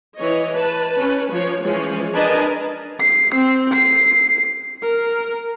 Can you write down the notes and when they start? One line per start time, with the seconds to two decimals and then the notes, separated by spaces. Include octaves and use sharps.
0.17 E3 C#5 D#5
0.53 B4 A5
0.94 C#4 B4
1.31 F3 C#5
1.62 E3 F3 G#3 C#4
2.14 D4 A#4 B4 D#5 G#5 A5
3.01 C7
3.35 C4
3.74 C7
4.83 A#4